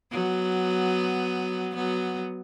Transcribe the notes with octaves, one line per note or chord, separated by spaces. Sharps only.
F#3 B3
F#3 B3